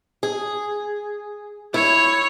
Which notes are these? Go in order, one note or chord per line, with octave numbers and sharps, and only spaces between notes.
G#4
E4 C#5